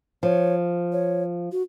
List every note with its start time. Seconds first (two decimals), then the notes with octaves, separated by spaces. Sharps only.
0.23 F3 C#5
0.92 C#5
1.52 F#4